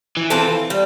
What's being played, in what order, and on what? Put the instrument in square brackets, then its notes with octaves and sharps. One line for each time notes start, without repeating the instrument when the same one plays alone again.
[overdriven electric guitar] E3
[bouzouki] C4 F4 A4
G3